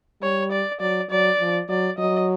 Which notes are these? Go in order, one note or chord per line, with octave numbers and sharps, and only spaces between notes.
G3 C#5
D5
F#3 D5
F#3 D5
F3
F#3 D5
F#3 D#5